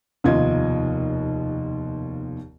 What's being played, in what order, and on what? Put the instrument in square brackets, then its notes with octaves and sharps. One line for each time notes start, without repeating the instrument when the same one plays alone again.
[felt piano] F1 D#2 B2 F4 D#5 G#6